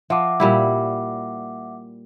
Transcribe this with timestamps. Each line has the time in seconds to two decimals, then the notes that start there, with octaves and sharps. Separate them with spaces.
0.10 F3 E5 F#5 D6
0.40 A#2 G3 E4